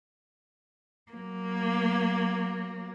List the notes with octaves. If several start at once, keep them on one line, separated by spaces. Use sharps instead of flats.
F#3 A#3